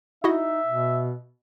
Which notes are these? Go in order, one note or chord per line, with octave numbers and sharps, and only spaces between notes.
D#4 E4 F#4 D#5 E5
B2